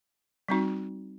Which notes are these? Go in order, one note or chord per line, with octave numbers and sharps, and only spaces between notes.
G3 C4 D#4 F#4